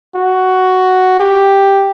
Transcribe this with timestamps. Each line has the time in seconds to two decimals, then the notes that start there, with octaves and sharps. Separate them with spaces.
0.16 F#4
1.20 G4